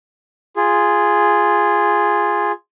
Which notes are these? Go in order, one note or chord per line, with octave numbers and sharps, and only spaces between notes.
F4 G#4